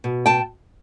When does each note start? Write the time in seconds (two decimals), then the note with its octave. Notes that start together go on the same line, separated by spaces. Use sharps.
0.04 B2
0.26 G5 A5